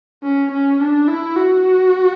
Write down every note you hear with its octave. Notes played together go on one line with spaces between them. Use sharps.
C#4
C#4
D4
E4
F#4